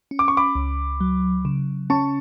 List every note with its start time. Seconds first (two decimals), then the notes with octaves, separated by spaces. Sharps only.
0.11 C#4
0.19 D6
0.28 C#6
0.37 B5 D6
0.55 C#2
1.01 F#3
1.45 C#3
1.90 C#4 A5 C#6